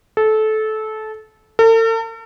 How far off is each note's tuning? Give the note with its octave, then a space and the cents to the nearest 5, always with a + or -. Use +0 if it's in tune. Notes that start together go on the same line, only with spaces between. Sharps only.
A4 -20
A4 +45